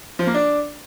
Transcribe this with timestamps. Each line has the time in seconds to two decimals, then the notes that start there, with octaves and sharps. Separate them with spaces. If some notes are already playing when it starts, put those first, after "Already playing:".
0.19 F3
0.27 A#3
0.34 D4